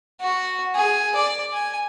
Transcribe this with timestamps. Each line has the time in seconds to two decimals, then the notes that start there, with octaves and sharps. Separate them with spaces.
0.21 F#4
0.75 G#4
1.15 D5
1.53 G#5